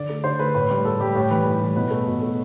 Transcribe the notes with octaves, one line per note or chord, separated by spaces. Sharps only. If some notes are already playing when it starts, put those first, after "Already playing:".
Already playing: D3 D5
A3
D3 C5
A3 B4
A2 B4
G3 B4
A2 A4
G3 G4
A2 G4
E3 G3 B4
A2
E3 G3
B2 B4
A3
B2
A3